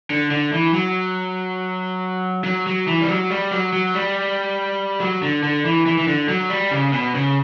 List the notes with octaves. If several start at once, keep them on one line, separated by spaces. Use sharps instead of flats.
D3
D3
E3
F#3
F#3
F#3
E3
G3
F#3
G3
F#3
F#3
G3
F#3
D3
D3
E3
E3
E3
D3
F#3
G3
C#3
B2
C#3